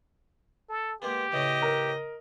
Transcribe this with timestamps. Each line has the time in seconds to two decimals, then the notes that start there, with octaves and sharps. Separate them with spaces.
0.69 A4
1.02 G#3 A#3 B3 G4
1.32 A2 C#3 E3 D#5
1.62 A#4